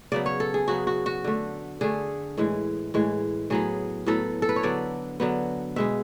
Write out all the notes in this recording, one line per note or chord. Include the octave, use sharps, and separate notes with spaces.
C#3 F#3 B3 D5
C#5
A4
G#4
C#3 F#3 B3 F#4
F#4
F#4
D3 A3
D3 A3 G#4
A2 E3 G#3
A2 E3 G#3
A2 F#3 B3 G#4
A2 F#3 B3 A4
A4
B4
C#5
D3 F#3 B3 D5
D3 F#3 B3
B2 G#3 B3 E5